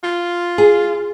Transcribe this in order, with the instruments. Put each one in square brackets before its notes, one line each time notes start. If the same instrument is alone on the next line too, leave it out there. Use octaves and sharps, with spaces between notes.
[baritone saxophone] F4
[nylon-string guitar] G#4